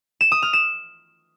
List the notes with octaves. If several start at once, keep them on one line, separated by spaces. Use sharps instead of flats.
E7
D#6
F6
E7